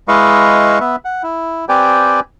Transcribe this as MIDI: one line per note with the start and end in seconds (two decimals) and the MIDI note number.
0.08 0.79 56
0.08 0.79 64
0.08 0.79 71
0.08 0.79 75
0.08 0.79 77
0.08 0.79 85
0.80 0.96 59
0.80 0.96 71
0.80 0.96 76
1.05 1.23 78
1.23 1.65 64
1.69 2.20 60
1.69 2.20 67
1.69 2.20 71
1.69 2.20 74
1.69 2.20 79
1.69 2.20 80